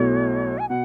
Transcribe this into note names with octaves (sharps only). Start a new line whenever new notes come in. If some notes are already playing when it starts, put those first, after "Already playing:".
Already playing: B1 B2 F#3 A3 E4 C#5
G#5
B2 F#5